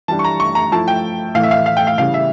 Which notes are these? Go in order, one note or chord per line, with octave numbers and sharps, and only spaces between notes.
E3 G3 D4 A5
C#6
A#5
C#6
A#5
F3 A3 E4 A5
G5
A2 E3 A3 F5
E5
F5
F5
G5
F5
C#3 E3 G3 F5
E5